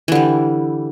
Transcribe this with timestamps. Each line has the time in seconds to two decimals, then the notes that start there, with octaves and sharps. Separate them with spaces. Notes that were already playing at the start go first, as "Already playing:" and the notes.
0.08 E3
0.12 D3
0.15 G3